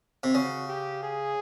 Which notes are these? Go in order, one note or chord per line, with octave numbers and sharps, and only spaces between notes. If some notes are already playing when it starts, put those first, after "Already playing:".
C3
C#3 F#4
G4
G#4